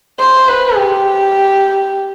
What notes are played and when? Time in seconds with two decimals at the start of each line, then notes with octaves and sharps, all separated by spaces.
0.20 C5
0.48 B4
0.77 G4